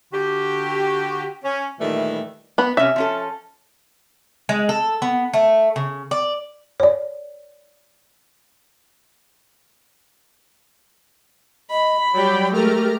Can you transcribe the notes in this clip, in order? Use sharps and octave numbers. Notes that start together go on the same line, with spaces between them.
D3 F#4 G4
C#4
A#2 D#3 E3 G3 A3
B3 B5
C3 C#4 E5
F3 C#4 A4
G#3
A4
B3
A3
C#3
D5
C#5 D5
D#5 B5
F#3 G3 G4 C#5 D5 G5
G#3 A3 G4 A#4 A#5 F6